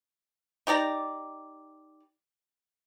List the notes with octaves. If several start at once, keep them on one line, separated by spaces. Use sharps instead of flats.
D#4 G4 D5 A#5